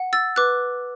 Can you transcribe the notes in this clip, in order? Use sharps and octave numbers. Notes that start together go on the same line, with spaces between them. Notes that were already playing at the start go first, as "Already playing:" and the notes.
Already playing: F#5
E6 A6
B4 D6 F#6